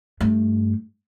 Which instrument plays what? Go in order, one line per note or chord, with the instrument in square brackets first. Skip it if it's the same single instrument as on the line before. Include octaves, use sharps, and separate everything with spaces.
[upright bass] G2 A3